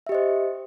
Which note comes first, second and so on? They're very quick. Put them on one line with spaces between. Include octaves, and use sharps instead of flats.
E5 G4 D#5 C5